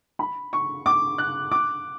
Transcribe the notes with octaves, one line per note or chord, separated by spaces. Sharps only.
B5
C#6
D6
F#6
D6